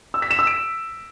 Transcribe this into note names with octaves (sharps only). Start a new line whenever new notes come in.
E6
B6
E7
E6
D7